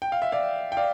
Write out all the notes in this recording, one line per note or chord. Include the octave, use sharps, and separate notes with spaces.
G5
F5
E5
D5 F5
G5
D5 F5